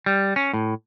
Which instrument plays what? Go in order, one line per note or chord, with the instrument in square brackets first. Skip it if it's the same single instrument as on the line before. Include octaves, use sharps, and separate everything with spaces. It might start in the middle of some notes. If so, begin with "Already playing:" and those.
[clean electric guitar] G3
C#4
A2